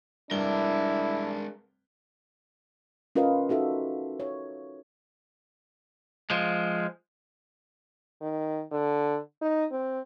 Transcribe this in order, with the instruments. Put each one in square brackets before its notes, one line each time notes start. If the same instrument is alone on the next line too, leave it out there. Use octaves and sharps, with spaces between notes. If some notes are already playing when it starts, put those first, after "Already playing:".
[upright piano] F1 G2 G7 [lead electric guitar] G#3 A#4 [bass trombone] D4 [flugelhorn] E4
[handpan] C#4 F4 A#4 B4 D#5 F5
D#4 F#4 A4 E5
C#5
[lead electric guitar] F3 G#3
[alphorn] D#3
D3
D#4
C4